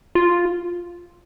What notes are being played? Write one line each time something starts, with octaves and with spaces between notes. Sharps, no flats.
F4